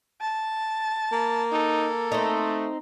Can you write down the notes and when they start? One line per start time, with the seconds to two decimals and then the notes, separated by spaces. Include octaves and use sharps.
0.21 A5
1.12 A#3
1.52 D#4 A4
2.12 A3 C4 D#4